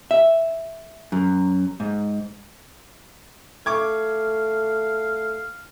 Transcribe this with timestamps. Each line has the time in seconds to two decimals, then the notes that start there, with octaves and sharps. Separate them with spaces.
0.11 E5
1.12 F#2
1.80 G#2
3.66 A3 F5 C#6 D6 G#6